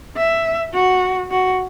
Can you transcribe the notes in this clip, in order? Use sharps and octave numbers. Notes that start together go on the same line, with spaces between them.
E5
F#4
F#4